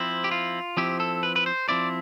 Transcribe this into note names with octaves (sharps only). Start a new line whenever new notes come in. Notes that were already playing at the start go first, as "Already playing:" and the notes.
Already playing: F3 C4 E4
G4
F4
F3 C4 E4 G4
A4
B4
B4
C5
F3 C4 E4 D5